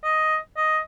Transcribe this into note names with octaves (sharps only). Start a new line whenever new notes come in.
D#5
D#5